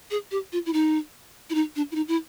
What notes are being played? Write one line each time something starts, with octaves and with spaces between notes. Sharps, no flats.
G#4
G4
F4
E4
D#4
E4
D#4
D4
E4
D#4
E4